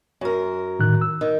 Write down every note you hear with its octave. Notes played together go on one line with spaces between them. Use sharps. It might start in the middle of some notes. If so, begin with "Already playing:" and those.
F#2 A#4
A2 D#3 F#6
E6
D#3